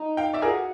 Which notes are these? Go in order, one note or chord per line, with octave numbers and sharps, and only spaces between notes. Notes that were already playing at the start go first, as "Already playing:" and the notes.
Already playing: D#4
F5 G5
D5 E5
F4 G#4 A#4
F#4